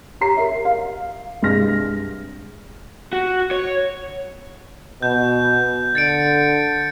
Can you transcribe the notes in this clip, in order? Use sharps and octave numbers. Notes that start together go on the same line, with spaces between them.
G4 C#5 A#5 C7
A#4 E5
F5
C2 G2 G#3 F6 A#6
F#4
C#5
B2 G6
D3 A6 C#7 D7